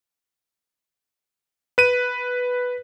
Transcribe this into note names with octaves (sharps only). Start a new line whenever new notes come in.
B4 D#7